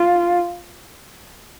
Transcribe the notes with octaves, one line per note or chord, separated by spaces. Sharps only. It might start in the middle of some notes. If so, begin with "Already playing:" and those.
Already playing: F4